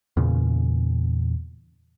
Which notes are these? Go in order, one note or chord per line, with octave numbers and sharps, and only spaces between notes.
E2 A#2 C#3